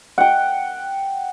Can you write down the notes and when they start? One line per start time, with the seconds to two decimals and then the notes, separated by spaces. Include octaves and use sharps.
0.18 F#5 G5